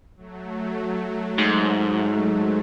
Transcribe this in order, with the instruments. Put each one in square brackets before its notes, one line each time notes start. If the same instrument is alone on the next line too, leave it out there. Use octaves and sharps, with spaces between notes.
[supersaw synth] F#3 A3
[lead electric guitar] G#2